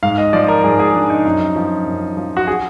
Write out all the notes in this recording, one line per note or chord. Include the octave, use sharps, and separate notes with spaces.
G#2 F5
D#5
F3 D5
A#4
G#2 G#4
G#4
F3 D4
D#4
F#2
F3
F#2
F3
F#4
G#4